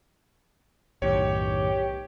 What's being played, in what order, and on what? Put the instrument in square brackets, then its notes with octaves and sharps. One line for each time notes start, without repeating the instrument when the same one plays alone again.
[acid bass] B1 [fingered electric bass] F#2 A2 D#3 [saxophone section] G4 [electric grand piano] C#5